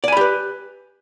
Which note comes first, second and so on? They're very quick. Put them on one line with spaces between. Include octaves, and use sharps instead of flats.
D5 G#5 B5 G4 B4